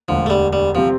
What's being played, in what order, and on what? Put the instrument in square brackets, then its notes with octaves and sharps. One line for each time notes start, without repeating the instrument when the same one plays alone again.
[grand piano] E1 D2 D3 [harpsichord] F3
[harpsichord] A3
G3
G3
[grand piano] C3 G3 C4 G4 [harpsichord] F3